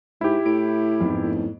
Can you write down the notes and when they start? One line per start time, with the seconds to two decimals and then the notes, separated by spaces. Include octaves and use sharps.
0.21 G#2 E4 G4
0.46 A2 D7
1.00 F2 G#2 B3
1.23 A2